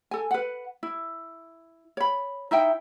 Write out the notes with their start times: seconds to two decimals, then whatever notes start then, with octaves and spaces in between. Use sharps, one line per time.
0.11 A4 G#5
0.31 B4 F#5
0.83 E4
1.97 C#5 B5
2.51 D#4 E4 E5 G5